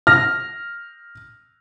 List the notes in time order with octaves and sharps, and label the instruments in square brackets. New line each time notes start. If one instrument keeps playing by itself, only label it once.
[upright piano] F6 A#6